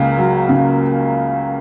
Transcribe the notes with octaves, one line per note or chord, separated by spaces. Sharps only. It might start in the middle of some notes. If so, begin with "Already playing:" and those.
Already playing: C#2 C#3 A#3
F#3
C#3